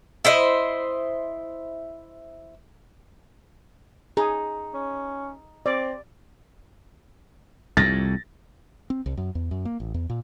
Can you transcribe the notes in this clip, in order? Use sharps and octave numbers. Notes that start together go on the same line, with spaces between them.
E4 C5 D#5
D#4 G#4
C#4
C4 D5
C2 F2 A6 A#6
C4
C2
F#2
E2
F#2
A#3
A1
E2
A#2